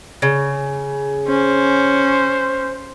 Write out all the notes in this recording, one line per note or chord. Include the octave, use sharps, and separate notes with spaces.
C#3
C#4 C5